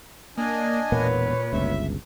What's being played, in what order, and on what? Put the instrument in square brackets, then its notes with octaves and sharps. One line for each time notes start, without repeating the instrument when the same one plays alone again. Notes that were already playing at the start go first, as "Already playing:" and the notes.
[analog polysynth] A#3 [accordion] D4 D#5 G#5
[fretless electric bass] E1 A#3 B3 [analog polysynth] A#2 [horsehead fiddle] B4 C#5
[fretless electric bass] G1 C#2 [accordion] E5